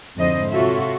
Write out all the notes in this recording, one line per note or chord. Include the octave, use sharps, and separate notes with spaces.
F2 G#2 D3 E4 C5 D#5
C3 F4 F#4 A4 C#5 E5